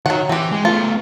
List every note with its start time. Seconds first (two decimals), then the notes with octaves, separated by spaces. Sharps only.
0.06 D#3 F#3 F#5
0.29 E3 C4 G4
0.52 G#3
0.65 A3 B3 F4